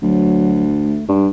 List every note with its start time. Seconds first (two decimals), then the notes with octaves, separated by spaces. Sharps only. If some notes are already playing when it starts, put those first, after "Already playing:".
0.02 D2 F#3
0.84 A3
1.09 G2 G3